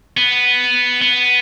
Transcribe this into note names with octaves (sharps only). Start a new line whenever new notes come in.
B3
B3